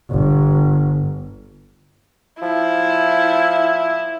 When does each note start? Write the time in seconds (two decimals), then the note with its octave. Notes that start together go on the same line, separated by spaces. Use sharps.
0.11 G1
2.42 F3 E4